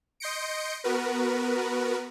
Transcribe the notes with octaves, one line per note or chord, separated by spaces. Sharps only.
D#5 C6 G6 A#6 C#7 D7
B3 F#4 A#4 B4